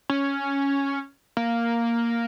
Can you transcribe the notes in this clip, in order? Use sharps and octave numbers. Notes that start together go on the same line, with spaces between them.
C#4
A#3